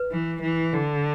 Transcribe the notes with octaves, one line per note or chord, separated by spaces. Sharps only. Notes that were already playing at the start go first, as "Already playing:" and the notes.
Already playing: B4
E3
E3
D3